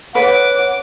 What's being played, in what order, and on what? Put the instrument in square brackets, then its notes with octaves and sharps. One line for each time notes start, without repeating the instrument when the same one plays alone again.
[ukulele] B4 [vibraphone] C#5 [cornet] F#5 [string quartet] D6